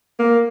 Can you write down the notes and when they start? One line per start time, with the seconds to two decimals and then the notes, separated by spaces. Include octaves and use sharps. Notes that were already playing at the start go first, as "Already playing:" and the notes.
0.19 A#3